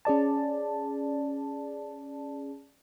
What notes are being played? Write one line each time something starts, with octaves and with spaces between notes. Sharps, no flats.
C#4 G#4 D5 A5